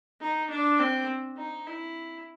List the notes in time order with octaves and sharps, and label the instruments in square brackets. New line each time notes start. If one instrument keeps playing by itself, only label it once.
[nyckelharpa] D#4
D4
C4
D#4
E4